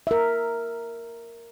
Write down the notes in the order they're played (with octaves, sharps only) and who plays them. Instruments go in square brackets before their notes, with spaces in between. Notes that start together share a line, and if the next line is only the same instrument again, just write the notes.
[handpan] A#4 E5